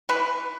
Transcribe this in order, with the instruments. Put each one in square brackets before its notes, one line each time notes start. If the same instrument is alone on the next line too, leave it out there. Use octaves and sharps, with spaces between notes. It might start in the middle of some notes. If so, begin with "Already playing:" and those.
[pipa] E3 B4